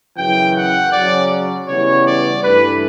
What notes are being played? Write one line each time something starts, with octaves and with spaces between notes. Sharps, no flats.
F#2 C#3 E3 G5
F#5
C#3 F#3 C#4 D5
C#3 E3 G3 B3 C#5
D5
G2 E3 A3 B4